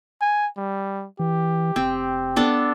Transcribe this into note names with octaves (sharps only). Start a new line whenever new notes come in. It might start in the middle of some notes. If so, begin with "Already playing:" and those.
G#5
G3
E3 G4
F1 C4
B3 D4 A4